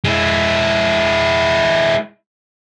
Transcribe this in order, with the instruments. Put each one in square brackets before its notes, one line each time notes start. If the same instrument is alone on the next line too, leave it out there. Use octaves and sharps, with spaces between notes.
[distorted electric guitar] G#3 E4